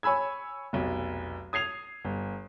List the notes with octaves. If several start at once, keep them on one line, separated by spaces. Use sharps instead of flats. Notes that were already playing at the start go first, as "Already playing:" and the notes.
C#5 G#5 B5 E6 G#6
F1 B1
D#6 G#6 C7 F7
G1